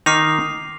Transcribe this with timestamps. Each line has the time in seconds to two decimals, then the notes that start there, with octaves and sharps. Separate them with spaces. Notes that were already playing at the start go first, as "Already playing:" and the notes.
0.06 D#3 D#4 D6 F6 C7 F7